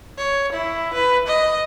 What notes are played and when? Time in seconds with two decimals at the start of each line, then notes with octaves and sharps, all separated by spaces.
0.17 C#5
0.52 E4
0.93 B4
1.27 D#5